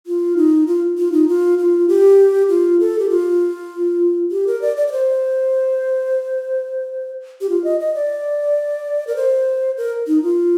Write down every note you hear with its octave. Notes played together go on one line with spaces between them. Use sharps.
F4
D#4
F4
F4
D#4
F4
F4
G4
F4
A4
G4
F4
G4
A#4
D5
D5
D5
C5
G4
F4
D#5
D#5
D5
A#4
C5
A#4
D#4
F4